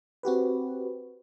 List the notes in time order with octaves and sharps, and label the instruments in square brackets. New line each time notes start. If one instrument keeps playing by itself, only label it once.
[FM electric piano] C4 F#4 G4 B4